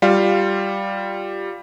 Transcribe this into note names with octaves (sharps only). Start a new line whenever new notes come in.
G3 F4 F5